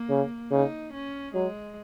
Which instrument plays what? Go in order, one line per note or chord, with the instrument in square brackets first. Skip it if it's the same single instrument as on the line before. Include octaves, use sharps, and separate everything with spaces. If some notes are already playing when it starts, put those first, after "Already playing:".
Already playing: [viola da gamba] A#3
[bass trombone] C#3
[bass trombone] C#3 [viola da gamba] D#4
[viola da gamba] C#4
[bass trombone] F#3 [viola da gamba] G#3